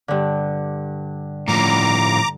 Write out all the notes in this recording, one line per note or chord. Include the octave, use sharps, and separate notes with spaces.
G2 D3
A2 F3 A#5 D6